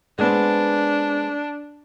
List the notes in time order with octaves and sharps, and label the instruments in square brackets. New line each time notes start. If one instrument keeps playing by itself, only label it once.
[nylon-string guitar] G#3 B3 C4 [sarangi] D4